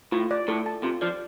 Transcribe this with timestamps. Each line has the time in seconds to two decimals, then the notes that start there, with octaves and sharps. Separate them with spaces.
0.12 A2 F4
0.31 D5
0.48 A2 A4
0.66 A5
0.83 C3 F4
1.02 F3 D5